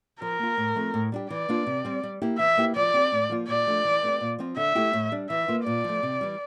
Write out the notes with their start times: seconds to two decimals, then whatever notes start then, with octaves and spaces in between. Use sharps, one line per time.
0.21 F3 A#4
0.39 A#3 F4
0.57 A2
0.75 F3 A3 C4
0.94 A2
1.12 G3 D4 G4
1.30 E3 D5
1.49 A#3 D4 F4
1.67 C3
1.85 G3 C4
2.03 G3
2.22 A#3 E4 G4
2.39 E3 E5
2.57 A#3 E4 G4
2.76 F3 D5
2.94 C4 G4
3.12 A2
3.30 F3 A#3 F4
3.48 A#2 D5
3.66 F3 A3 D4
3.85 E3
4.03 A3 C4 E4 G4
4.21 A#2
4.39 F3 C4 F4
4.57 D3 E5
4.75 A3 E4 G4
4.93 A2
5.12 G3 D4
5.30 E3 E5
5.48 A#3 F4
5.66 A#2 D5
5.84 F3 A3
6.03 C3
6.21 E3 G3